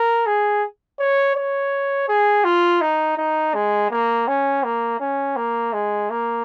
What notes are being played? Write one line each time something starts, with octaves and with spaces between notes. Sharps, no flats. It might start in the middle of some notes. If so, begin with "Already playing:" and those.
Already playing: A#4
G#4
C#5
C#5
G#4
F4
D#4
D#4
G#3
A#3
C#4
A#3
C#4
A#3
G#3
A#3